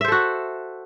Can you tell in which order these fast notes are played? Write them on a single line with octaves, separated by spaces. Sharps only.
E5 C5 A4 F#4